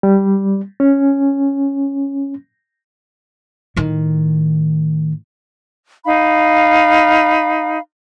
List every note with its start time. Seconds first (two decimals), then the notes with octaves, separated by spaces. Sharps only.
0.03 G3
0.80 C#4
3.76 A2 D#3
6.05 D#4 F5 B5